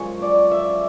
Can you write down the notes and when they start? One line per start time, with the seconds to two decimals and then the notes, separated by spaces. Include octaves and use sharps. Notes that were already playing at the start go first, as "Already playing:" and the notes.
Already playing: F#2 C#3 F3 G#3 C#5
0.22 D5
0.51 E5